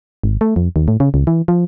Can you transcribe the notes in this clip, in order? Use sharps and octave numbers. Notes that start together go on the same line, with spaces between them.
G#1
A3
F2
D#2
A2
C#3
C#2
E3
F3